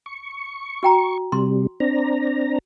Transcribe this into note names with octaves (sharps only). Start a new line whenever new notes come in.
C#6
F#4 G5 A#5
C3 G3 C6
C4 D4 A#5